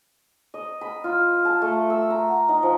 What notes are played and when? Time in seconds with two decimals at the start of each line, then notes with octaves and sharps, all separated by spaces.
0.54 D#5
0.81 B5
1.04 F4
1.45 A5
1.62 A3
1.90 E6
2.10 A#5
2.28 F#5
2.49 D#4
2.63 F3